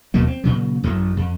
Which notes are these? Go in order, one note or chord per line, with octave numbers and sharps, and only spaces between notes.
D#2 B2 F#3 A#3
C4
A#2 C#3 F#3
A1 F#2 F#3 A3
F2